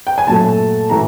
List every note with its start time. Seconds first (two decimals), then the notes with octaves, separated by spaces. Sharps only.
0.07 G5
0.18 G#5
0.27 A#2 F#3 A3 A5
0.89 A2 E3 A3 A#5